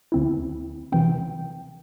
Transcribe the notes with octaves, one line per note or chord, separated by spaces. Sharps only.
D2 D3 C4 E4
C3 E3 C4 G5